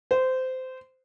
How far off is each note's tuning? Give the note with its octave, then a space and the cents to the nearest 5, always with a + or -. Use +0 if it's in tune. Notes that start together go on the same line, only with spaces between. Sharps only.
C5 -20